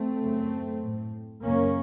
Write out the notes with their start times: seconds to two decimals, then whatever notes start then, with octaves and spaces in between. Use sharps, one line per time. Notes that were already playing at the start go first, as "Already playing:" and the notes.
Already playing: A3 C4
0.21 F#2 C#3
0.82 A2
1.43 F#2 C#3 A#3 C#4